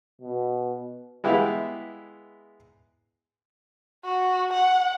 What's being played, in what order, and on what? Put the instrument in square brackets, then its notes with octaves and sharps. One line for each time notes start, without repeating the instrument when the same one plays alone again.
[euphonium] B2
[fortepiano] G#3 B3 E4 G4 E5 F5
[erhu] F#4
F#5